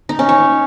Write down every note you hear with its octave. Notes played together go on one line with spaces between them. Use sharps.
D#4
C#4
C#5